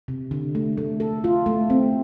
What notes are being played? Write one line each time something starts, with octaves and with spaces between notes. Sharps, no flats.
C3
D3
A3
A3
A4
F4
A3
C4